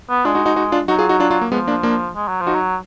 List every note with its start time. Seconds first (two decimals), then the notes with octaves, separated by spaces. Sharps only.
0.09 B3
0.25 G#3 D4 F4
0.35 D#4 F#4
0.45 D#4 F#4
0.56 D#4 F#4
0.72 D4 F4
0.88 F#3 D#4 F#4
0.99 F4 G#4
1.09 D#4 F#4
1.20 D4 F4
1.31 D4 F4
1.41 A#3
1.52 F3 G#3 B3
1.67 A#3 D4
1.83 A#3 D4
2.15 G#3
2.28 F#3
2.41 F3
2.47 D#4 F#4
2.54 F#3